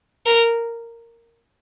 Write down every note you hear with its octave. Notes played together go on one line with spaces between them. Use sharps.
A#4